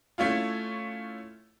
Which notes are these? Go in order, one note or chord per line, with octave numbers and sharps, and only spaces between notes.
A3 C#4 E4 F4